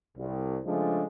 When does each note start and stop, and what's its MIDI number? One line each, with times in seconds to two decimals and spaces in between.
0.16 0.58 36
0.65 1.02 49
0.65 1.02 53
0.65 1.02 56
0.65 1.02 57
0.65 1.02 62